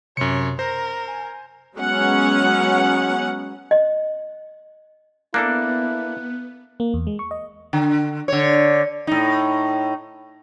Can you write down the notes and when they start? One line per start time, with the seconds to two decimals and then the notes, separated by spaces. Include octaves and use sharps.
0.17 F#2 C3 C#5 C#7
0.59 A#4 C5 A#6
1.07 G#5
1.76 F#3 G#3 B3 C#4 C#5 F#5
3.71 D#5
5.34 A#3 B3 D4 E4 A4 F#6
6.80 A#3
6.94 E2
7.07 G#3
7.19 C#6
7.31 D#5
7.73 D3
8.28 D3 C#5
9.07 A2 D#4